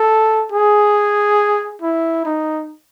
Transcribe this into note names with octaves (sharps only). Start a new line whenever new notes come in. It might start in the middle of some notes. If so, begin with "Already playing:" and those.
Already playing: A4
G#4
E4
D#4